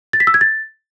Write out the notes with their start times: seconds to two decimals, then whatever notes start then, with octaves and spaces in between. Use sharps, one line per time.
0.13 A6
0.20 B6
0.27 E6
0.34 G#6
0.41 A6